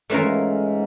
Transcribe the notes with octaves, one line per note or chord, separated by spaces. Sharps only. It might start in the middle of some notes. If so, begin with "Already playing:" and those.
G#2 E3 A3 C#4 F4 A#4